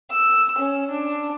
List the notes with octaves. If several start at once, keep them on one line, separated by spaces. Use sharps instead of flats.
E6
C#4
D4